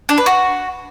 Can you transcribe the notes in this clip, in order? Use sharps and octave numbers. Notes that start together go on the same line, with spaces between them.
D4
B4
F#4